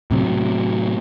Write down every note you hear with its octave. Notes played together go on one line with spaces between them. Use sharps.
A2 C3 F#3